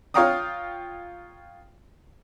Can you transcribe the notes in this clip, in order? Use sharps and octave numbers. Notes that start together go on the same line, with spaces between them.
F4 C#5 F5 G5 A#5 D#6